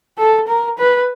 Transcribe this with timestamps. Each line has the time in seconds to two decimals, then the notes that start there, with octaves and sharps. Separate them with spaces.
0.18 A4
0.47 A#4
0.78 B4